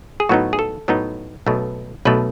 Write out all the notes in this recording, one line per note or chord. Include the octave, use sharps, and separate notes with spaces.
G#4
A2 F#3 B3 D#4 F#4
G#4
A4
A2 F#3 B3 D#4
B1 B2 A3
B1 B2 A3 B4